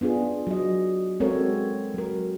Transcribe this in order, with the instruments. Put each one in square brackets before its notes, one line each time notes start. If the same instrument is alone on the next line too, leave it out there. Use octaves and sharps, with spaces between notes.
[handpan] B3 D4 F4 G#4
F#3 D#5
G#3 C4 F#4 A4 A#4 C#5
F#3 A#4